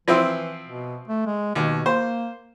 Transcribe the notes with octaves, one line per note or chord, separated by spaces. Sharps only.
E3 F3 C4 E4
B2
A3
G#3
D#2 B2
A#3 C5